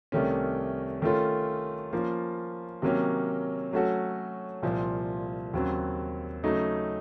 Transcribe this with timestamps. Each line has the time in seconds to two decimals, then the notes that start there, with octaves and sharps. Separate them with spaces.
0.12 C2 C3 D#3 A3 C#4
1.02 D#3 A3 C#4 F4 A4
1.93 F3 A#3 C#4 F4
2.82 C3 D#3 F#3 A#3 C#4
3.73 F#3 A3 C#4 F#4 A4
4.62 C2 A#2 F3
5.53 D#2 C#3 F#3 C4
6.44 C#3 F#3 A3 D#4